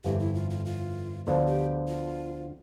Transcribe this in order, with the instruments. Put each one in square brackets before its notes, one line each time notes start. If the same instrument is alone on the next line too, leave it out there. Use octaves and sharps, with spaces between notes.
[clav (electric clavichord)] G1 F2 E3 A3 [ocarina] G4
[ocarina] E4
F4
F4
F4
[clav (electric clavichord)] D2 D3 F3 B3 D4 [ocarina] F4
[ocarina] G4
F4